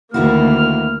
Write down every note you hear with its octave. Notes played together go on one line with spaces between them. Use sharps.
D2 D#3 A#3 E4 F#4 F6